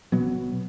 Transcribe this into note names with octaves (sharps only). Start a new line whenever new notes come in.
B1 B2 F#3 B3